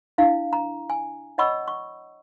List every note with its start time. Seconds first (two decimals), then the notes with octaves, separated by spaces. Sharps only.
0.18 D4 E4 F5
0.53 A#5
0.90 G#5
1.38 C#5 D#5 F#5 B5 C#6 E6
1.68 C#6